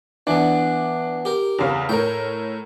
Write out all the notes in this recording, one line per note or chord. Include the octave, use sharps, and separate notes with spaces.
E3 B3 D4
G4 A#4
E2 C#3
A2 A#4 C#5 G5